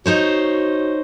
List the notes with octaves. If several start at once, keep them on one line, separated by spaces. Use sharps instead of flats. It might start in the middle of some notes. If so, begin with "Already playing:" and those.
D#4 F#4 C5 C#5